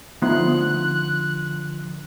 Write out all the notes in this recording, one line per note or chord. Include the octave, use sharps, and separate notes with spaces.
D3 F3 A3 B3 D#4 C6 F#6